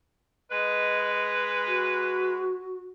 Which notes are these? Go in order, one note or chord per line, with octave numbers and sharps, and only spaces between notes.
G#3 B4 D#5
F#4